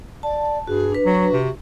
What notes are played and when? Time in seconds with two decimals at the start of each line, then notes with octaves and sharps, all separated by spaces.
0.23 D5 A5
0.67 G2 F#4 G#4
0.92 D4 B4
1.06 F#3 F#4
1.33 C3